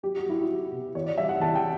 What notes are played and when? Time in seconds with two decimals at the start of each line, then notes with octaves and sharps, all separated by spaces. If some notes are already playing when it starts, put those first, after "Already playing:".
0.03 F#3 G4
0.17 F#4
0.26 F#3 E4
0.42 F#4
0.50 F#3
0.71 B2
0.95 E2 C#5
1.06 D5
1.18 G3 E5
1.29 F#5
1.40 E2 A5
1.56 G5